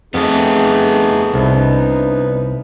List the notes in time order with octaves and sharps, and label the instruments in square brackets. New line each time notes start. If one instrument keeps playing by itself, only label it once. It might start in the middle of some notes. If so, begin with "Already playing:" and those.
[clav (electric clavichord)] F2 [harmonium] A3 D#4 G#4 [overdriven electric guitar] B3 A4
[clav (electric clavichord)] C2 [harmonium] D#4
[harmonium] D4 D#4